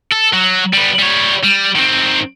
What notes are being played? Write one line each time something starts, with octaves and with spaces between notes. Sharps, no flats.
A4
F#3
G3 B3
G3 C#5
G3
D#3 C4